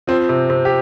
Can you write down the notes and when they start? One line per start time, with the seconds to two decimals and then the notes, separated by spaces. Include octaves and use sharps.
0.07 F3 C4
0.29 C3
0.50 C3
0.65 G4